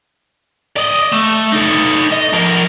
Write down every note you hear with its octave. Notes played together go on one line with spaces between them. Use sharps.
D5 D#5
A3
D#4 A4
D#5
F3 A#4